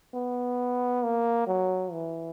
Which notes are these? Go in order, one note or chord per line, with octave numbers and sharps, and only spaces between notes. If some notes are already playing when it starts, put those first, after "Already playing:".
B3
A#3
F#3
E3